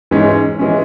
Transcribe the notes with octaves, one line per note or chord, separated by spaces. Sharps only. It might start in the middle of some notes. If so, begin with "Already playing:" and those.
G#2 E3 G#3 C#4
E3 G#3 C#4